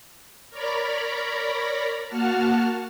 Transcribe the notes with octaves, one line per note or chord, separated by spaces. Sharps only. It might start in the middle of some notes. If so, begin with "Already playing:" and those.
A#4 C#5 D5 A#5 B5
A#3 F#4 F#5 A5 F6